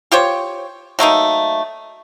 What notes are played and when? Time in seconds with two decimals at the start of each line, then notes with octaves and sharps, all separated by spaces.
0.12 F4 G4 C5 C#5
0.99 F#3 A3 A#3 D#4